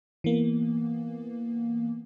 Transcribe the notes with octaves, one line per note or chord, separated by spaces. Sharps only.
E3 A#3 B3